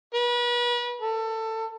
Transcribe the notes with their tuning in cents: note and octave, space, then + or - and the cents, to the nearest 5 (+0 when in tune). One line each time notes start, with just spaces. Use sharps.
B4 -35
A4 +20